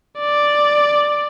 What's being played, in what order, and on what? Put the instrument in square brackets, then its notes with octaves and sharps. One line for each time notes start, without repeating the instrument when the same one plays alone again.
[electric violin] D5